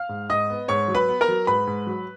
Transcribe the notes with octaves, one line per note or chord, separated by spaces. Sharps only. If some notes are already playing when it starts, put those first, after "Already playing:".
Already playing: F5 F6
G#2
G#2 D#5 D#6
B3
G#2 C#5 C#6
F#3
B4 B5
B3
A#4 A#5
F#3
G#2 B4 B5
G#2
F#3